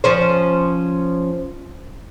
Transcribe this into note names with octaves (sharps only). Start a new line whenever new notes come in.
F3 C#4 C5